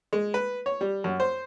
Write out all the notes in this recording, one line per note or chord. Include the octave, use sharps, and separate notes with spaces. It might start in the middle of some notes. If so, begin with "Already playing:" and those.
G#3
B4
C#5
G3
F#2
C5